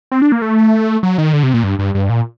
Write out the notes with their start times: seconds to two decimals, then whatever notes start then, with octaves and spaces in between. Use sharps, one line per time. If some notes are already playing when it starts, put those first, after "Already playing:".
0.12 C4
0.22 D4
0.32 A#3
0.42 A3
1.03 F#3
1.18 D#3
1.33 D3
1.43 C3
1.54 A#2
1.64 G2
1.79 G2
1.95 G2
2.10 A#2